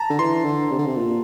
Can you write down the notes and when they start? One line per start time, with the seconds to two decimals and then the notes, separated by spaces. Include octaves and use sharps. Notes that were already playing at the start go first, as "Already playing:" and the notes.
Already playing: A5 A#5
0.10 D3
0.19 E3 C6
0.44 D3
0.71 C3
0.78 D3
0.86 C3
0.97 A#2